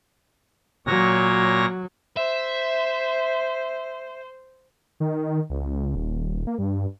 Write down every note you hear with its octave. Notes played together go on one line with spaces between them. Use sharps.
A#2 F#3 C#5 A#6
C5 E5
D#3
C#2
D#1
A#3
G2